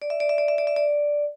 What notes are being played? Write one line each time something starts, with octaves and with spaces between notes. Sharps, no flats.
D5
E5
D5
E5
D5
E5
D5
E5
D5